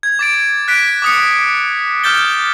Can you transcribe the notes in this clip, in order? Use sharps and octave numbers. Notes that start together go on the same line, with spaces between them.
G#6
D6 A6 D7
F#6 B6 D7
D6 D#6 C#7
D6 F6 G6 A6 G7